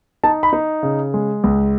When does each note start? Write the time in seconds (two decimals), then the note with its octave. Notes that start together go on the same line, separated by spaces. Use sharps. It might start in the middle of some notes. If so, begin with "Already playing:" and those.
0.24 D#4 A5
0.43 B5
0.53 D#4
0.83 C#3
1.14 G#3
1.44 C#2